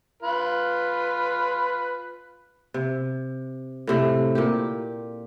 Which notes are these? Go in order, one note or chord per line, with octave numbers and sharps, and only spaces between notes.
F4 B4
C3
A2 C3 A3
A#2 G4